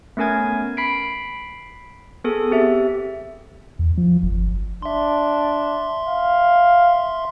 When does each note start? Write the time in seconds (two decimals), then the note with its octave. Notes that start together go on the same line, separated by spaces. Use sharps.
0.17 A3 B3 C#4 A#4 G#5 G#6
0.77 B5 B6 C7 D7
2.24 B3 G#4 A4
2.51 C4 G4 E5
3.79 E2
3.98 F3
4.23 G1
4.82 D4 E5 C6
6.09 F5